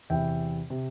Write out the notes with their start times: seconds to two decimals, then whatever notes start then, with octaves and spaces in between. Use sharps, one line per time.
0.10 E2 C3 E3 E5 G5
0.70 C3